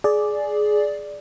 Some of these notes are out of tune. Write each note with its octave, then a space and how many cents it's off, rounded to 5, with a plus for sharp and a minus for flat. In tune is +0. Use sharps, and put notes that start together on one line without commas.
G#4 +15 D5 +0